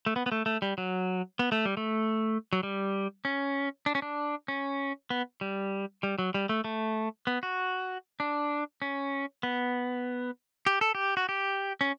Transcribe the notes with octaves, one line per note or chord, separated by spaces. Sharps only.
A3
B3
B3
A3
A3
G3
F#3
B3
A3
G3
A3
F#3
G3
C#4
D4
C#4
D4
C#4
B3
G3
G3
F#3
G3
A3
A3
B3
F#4
D4
C#4
B3
G4
A4
G4
F#4
G4
C#4